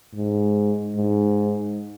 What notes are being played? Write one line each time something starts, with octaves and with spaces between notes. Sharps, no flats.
G#2
G#2